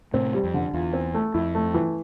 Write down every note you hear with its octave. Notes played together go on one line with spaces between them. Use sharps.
A2 C3 C4
G3
F2
D3
E2 F4
C4
A3
F2 E4
A3
E3